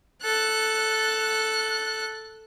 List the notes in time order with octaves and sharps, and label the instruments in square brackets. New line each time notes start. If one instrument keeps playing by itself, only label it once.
[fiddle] A4 F#6